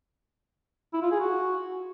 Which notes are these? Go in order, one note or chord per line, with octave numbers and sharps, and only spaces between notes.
E4
F4
G#4
F#4